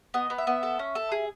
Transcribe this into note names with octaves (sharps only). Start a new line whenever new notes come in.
B3 D#5
B3
E5
B3
A4
C#4
A4
G#4